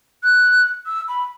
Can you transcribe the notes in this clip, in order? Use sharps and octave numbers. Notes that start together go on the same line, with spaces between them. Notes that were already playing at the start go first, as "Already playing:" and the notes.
F#6
E6
B5